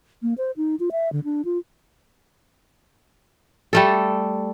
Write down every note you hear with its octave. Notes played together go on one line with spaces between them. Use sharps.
A#3
C5
D#4
F4
E5
D3
D4
F4
G3 A3 A4